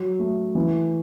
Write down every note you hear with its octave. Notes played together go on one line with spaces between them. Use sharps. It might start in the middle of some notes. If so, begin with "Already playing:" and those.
Already playing: F#3
A3
E3